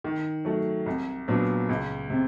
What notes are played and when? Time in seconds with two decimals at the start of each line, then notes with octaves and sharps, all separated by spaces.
0.04 D#3
0.45 F#3 A3
0.86 C2
1.28 A#2 F#3 B3 D4
1.69 C#2
2.10 C3